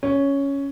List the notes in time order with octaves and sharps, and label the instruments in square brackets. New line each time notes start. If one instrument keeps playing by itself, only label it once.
[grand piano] C#4